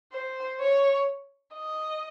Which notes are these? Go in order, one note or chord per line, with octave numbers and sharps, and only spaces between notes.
C5
C#5
D#5